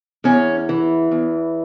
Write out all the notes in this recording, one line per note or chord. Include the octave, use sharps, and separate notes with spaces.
E2 C#4
E3
E2